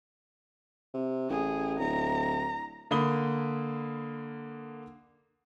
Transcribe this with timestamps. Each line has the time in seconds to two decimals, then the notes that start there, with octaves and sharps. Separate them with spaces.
0.94 C3
1.30 A1 G#4
1.79 D1 A#5
2.91 D3 A#3 B5 D#6 G7